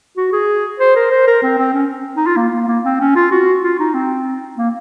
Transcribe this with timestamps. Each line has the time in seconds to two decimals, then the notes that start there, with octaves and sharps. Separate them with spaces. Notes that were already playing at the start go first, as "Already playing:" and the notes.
0.17 F#4
0.32 G#4
0.80 C5
0.96 A#4
1.11 C5
1.27 A#4
1.43 C4
1.59 C4
1.74 C#4
2.17 D#4
2.27 F4
2.36 A#3
2.53 A#3
2.68 A#3
2.85 C4
3.01 C#4
3.16 F4
3.32 F#4
3.63 F4
3.80 D#4
3.94 C4
4.58 A#3